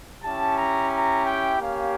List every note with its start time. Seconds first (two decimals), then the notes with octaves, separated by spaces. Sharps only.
0.22 C#4 E4 G4 A5
0.57 A#5
0.92 A#5
1.26 G5
1.60 A#3 C#4 G4 F5